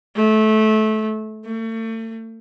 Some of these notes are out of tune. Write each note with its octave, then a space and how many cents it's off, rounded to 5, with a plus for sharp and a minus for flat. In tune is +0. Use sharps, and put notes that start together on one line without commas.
A3 -20
A3 +40